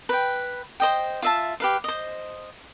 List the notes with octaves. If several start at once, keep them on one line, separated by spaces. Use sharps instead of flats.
B4 G5
C5 D#5 G5
F4 E5 A5
G4 B4 F5
C5 D#5